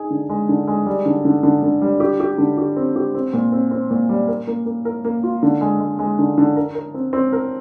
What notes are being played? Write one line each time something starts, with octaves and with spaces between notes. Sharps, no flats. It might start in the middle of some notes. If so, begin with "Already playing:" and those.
Already playing: D#4 G#4
D3
G#3
D3
G#3
G3
D3
D3
D3
D3
G3
G4
G4
D3
G4
C4
G4
C4
A#2
C4
C4
A#2
G3
A#4
A#3
A#3
A#4
A#3
F4
D3
G#3
G#3
G#3
D3
D3
A#4
A#4
C4
C4
A#4